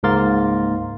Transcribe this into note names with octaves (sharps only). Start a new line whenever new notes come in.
C#2 G#2 A#3 A#4 C6 A6